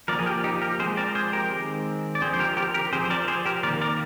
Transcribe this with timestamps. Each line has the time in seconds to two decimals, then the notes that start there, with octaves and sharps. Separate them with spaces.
0.08 F3 A#3 A#4 D5
0.19 G#4
0.26 G4 A#4
0.44 D#4 G4
0.62 G4 A#4
0.79 F3 G#3 C4 G#4 C5
0.97 A#4 D5
1.15 G#4 C5
1.33 G4 A#4
1.51 D#3 G#3 C4
2.15 D5
2.21 D3 F3 C4 G#4 C5
2.34 C5
2.39 G4 A#4
2.57 G4 A#4
2.74 G4 A#4
2.93 F3 C4 G#4 C5
3.05 C5
3.10 A#4 D5
3.28 G#4 C5
3.45 G4 A#4
3.63 D#3 A#3 A#4 D5
3.81 A#4 D5